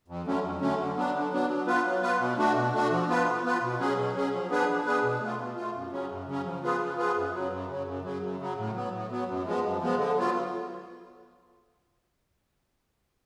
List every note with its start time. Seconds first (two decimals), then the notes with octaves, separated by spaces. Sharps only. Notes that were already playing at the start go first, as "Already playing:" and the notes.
0.08 F2
0.25 D3 F#3 A3 C#4
0.43 F2
0.61 D3 F#3 A3 C#4
0.78 D3
0.96 F#3 B3 D4
1.14 D3
1.32 F#3 B3 D4
1.49 F#3
1.67 B3 F4 B4
1.85 F#3
2.02 B3 F4 B4
2.19 B2
2.38 A3 D4 F#4
2.55 B2
2.73 A3 D4 F#4
2.91 F3
3.09 B3 F4 B4
3.26 F3
3.44 B3 F4 B4
3.62 B2
3.79 F#3 C#4 G#4
3.97 B2
4.15 F#3 C#4 G#4
4.33 F3
4.50 B3 D4 G#4 B4
4.68 F3
4.85 B3 D4 G#4 B4
5.03 B2
5.21 A3 F4
5.38 B2
5.56 A3 F4
5.74 F#2
5.92 C#3 F#3 C#4
6.09 F#2
6.27 C#3 F#3 C#4
6.45 F3
6.62 B3 F4 G#4 B4
6.80 F3
6.98 B3 F4 G#4 B4
7.16 F#2
7.34 C#3 F#3
7.52 F#2
7.69 C#3 F#3
7.86 F#2
8.04 C#3 F#3
8.22 F#2
8.39 C#3 F#3
8.57 A2
8.75 F#3 B3
8.93 A2
9.10 F#3 B3
9.28 F#2
9.46 F3 G#3 B3
9.63 F#2
9.81 F3 G#3 B3
9.98 D3
10.17 F#3 B3 F4